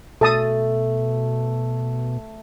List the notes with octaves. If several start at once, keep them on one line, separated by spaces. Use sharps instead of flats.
B2 A3 A4 A5 D#6